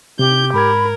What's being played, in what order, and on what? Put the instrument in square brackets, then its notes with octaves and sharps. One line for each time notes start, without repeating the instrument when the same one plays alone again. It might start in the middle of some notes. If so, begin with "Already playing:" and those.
[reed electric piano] C3 [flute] G4 [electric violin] G6
[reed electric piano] G#2 G#6 [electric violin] A#4 [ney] B5